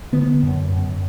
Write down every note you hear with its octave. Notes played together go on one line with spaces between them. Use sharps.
D3 B3
F#2
F#2